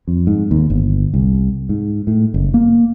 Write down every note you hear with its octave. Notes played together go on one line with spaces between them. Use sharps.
F2
G#2
D#2
G1
C2
G#2
A2
F#1
A#3